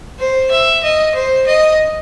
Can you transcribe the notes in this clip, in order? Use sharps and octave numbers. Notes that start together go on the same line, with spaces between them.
C5
E5
D#5
C5
D#5